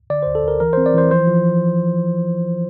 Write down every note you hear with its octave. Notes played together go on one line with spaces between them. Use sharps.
D3 D5
D2 C5
A4
D2 A#4
E3 A#4
C4 C5
D5
E3 C5
F3 C5
F3